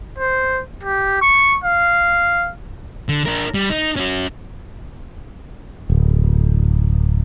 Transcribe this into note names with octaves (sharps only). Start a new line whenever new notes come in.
C5
G4
C#6
F5
D3
D4 A#4
G3
D#4
C#4 F#4
D1